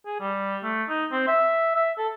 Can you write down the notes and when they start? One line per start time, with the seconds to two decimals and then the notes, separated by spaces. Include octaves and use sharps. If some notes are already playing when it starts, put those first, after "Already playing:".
0.06 G#4
0.20 G3
0.63 A3
0.89 D#4
1.12 C4
1.28 E5
1.76 E5
1.98 A4